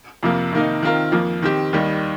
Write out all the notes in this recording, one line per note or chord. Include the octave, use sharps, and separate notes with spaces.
F2 C3 F3 A#3
C3 D#3 A#3 D#4
D#3 C4 F4 A#4
F2 F3 A#3
D#3 C4 G4
D#2 D#3 G3